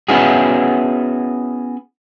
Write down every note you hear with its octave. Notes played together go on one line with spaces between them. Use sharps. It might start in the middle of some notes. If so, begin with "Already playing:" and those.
B3 C#4 E4 F#4 G#4